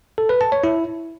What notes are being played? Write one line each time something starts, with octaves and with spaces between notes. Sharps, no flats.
A4
B4
A5
C#5
E4